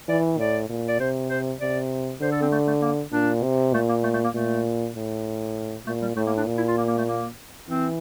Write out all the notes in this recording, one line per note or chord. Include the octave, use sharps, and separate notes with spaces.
E3 D5
A2 D5
A#2
D5
C3 C5
C5
C3 D5
D3 C5
A4
C4
A3
A3
A#3
A#2 D4
C3
A#2 A3
A#3
A3
A3
A#3
A#2 A3
A2
A#2 A3
G3
A2 A3
A#3
D4
A#2
E4
F4
A#3
A#3
A3
A#3
E3 C4